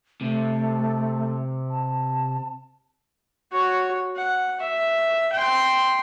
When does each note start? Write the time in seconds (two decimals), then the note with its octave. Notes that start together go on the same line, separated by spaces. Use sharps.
0.21 C3 A3
1.70 A5
3.52 F#4 C#5
4.16 F#5
4.60 E5
5.33 G5 C6